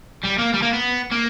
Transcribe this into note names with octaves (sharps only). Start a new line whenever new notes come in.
G3
A#3
G3
A#3
B3
A#3